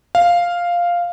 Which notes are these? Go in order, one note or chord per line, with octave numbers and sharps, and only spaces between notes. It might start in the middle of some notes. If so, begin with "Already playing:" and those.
F5